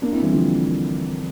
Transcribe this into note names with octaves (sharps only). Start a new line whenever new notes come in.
A#3 D4
C4 E4
E3 G3
D3 F3